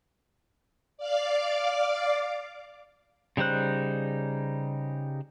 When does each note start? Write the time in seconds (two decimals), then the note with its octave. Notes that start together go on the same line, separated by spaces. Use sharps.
0.98 D5 F5 D6
3.37 C#3 G3 D#4 C5 F#6